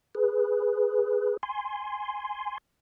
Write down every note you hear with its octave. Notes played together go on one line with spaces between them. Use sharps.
G#4 B4
G#5 C6